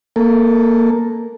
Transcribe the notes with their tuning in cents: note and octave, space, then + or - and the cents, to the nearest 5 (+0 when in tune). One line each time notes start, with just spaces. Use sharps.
A#3 +0 A4 +0